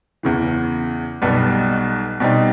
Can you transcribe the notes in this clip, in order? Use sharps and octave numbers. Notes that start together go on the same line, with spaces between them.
E2 C#3 E3
B1 B2 G3 B3
B2 G3 C4 D#4